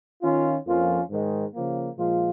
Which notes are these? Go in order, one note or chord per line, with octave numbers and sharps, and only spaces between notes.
D#3 C#4 F4
F2 F3 A#3 C#4 F4
G#2 D#3 G#3
C#3 F3 A#3
A#2 F3 G#3 F4